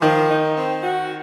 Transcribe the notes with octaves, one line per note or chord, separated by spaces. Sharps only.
D#3 F3
D#4
C4
F#4